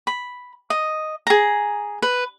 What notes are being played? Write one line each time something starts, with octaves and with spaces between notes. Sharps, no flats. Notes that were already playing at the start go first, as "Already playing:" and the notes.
B5
D#5
G#4 A#5
B4